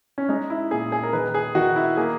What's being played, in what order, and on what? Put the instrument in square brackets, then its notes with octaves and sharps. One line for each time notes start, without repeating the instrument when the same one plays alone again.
[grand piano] C#4
G#3 D#4
E4
A#2 G#4
G#4
A#4
D#3 B4
G#4
D#3 F#4
E4
A#3 G#4